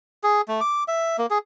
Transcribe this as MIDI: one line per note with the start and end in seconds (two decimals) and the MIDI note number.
0.23 0.41 68
0.48 0.60 57
0.61 0.84 86
0.88 1.17 76
1.18 1.26 58
1.31 1.38 68